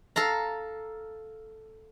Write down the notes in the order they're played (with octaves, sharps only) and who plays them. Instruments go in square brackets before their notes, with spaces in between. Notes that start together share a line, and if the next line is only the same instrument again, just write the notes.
[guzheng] A4 F5 A#5